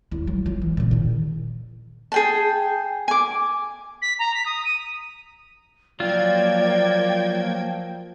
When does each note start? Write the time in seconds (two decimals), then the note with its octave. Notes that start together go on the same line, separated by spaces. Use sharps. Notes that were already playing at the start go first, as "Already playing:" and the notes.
0.11 D#2 E4
0.27 F#3
0.46 F4
0.62 E3
0.77 A#2 C#3
0.91 E2 D#3
2.12 G#4 G5 A5
3.08 G#5 D6
4.02 B6
4.19 A#5
4.34 B6
4.46 D#6
4.65 D#7
6.00 F3 F#3 A#3 F4 D5 G5 G#6